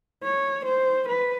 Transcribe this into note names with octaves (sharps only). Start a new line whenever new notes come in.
C#5
C5
B4